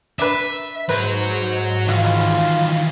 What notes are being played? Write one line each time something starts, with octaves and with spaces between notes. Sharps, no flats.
D4 B4 E5
G#2 F#3 B4 C5
D#3 E3 F#3 F4